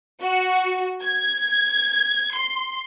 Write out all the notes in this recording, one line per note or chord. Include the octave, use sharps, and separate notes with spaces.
F#4
G#6
C6